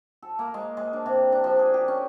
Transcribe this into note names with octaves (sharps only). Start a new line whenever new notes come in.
A4
A#3
G#3
G#3
D4
C3
D4
F3
G#4
G4
C#4